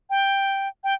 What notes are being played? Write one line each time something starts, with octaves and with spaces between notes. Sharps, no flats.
G5
G5